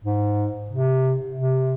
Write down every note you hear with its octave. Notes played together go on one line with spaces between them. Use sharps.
G#2
C3
C3